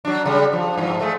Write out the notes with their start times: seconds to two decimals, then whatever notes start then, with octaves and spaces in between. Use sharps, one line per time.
0.05 F#3 D4
0.26 C#3 G3
0.53 F3
0.78 G2 F3
1.01 G#3 A3